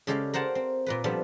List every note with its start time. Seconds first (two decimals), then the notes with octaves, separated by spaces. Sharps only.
0.07 C#3 G#3 G4 A4 D5 F5
0.34 A#4 C5 F5 F#5 A5
0.55 C4
0.86 A#2 A#3 B4
1.04 F3 G3 B3 D4 F4 A4